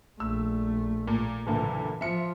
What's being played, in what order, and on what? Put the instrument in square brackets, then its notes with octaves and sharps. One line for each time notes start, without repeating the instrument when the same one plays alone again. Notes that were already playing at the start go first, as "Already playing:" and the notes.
[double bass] A#1 A3 [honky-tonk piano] E6
[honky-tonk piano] A#2
[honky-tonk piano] F#1 A#2 D3 [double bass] E3
[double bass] F3 [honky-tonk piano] E5 C#7